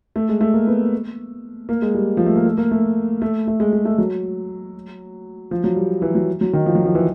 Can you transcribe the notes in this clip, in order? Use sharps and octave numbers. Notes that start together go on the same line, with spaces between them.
A3
G#3
A3
A#3
B3
A#3
G#3
G3
F3
A3
A#3
A3
A#3
A3
A3
A3
G#3
G#3
A3
F#3
F3
F#3
G3
E3
F#3
F#3
D#3
F3
F#3
F3
E3